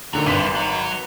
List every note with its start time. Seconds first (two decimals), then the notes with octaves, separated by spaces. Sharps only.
0.13 D2 D3 D#3 F#3
0.26 G#1 C3 G3 B4 B6 D#7 E7
0.56 F#3